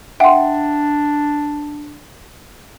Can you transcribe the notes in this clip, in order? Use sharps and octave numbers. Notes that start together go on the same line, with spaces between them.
D4 E5 F#5 G5 C6